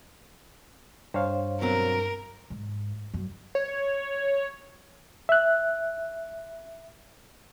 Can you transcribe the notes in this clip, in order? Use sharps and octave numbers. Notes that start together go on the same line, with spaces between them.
G2 C5 C#5 F5
B2 F#3 C4 A#4
G#2
F#2
C#5
E5 F#6